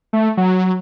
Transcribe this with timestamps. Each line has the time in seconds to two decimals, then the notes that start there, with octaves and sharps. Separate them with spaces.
0.13 A3
0.37 F#3